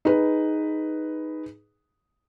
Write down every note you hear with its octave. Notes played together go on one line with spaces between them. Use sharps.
D#4 G#4 B4